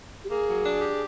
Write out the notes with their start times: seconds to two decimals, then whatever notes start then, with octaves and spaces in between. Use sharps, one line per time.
0.24 G4
0.30 A#3 G#4
0.47 F#3
0.64 D4
0.82 G4